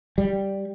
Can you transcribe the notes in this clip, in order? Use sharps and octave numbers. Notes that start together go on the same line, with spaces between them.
G3